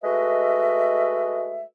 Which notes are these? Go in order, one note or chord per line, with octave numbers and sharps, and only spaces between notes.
G#3 A3 F#4 B4 D#5 E5